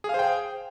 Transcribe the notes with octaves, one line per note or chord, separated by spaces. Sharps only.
G#4 C5 F5 G5